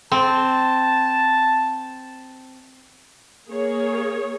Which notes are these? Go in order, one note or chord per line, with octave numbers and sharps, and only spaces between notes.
C4 A5
A#3 G#4 C#5